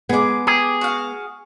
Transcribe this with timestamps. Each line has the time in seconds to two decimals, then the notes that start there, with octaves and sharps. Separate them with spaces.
0.09 G#3 B3 G#4 D6
0.47 G4 G#4
0.81 F#4 F5